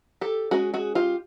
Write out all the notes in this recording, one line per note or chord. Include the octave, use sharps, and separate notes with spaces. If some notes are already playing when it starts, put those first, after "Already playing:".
G4 A4
G#3 C#4 F#4 G#4
F#4 G#4
F4 G4